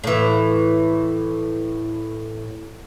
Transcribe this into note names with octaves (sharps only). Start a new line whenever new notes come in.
A2 E3